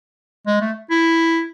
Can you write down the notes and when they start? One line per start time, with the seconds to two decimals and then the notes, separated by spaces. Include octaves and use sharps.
0.47 G#3
0.61 A3
0.91 E4